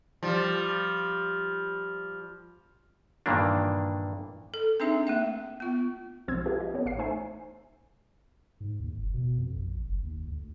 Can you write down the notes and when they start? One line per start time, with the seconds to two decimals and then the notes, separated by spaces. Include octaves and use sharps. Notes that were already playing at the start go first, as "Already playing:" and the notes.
0.23 F3 G3
3.26 G2 A#2 D#3 E3 A#3 D4
4.54 A4
4.80 C4 D4 D#4 G#4 E5
5.07 A3 A#3 E5
5.60 B3 F4
6.28 B1 F3 G#3 C4 E6 G#6
6.46 E4 F4 G4 G#4 B4
6.61 D#5
6.74 B3 C#4 G4 C#5
6.85 A1 C#5 F5 C7
6.98 A3 D#4 C5 E5 G#5
8.60 G#2
8.80 D#2
8.98 F#1
9.14 B2
9.38 F2
9.56 A#1
9.85 F#1
10.03 D#2
10.27 D2